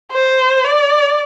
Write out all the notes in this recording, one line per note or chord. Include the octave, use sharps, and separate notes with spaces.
C5
D5